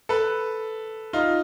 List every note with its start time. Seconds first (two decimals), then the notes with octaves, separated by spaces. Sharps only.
0.09 A4 B4
1.13 D#4 F4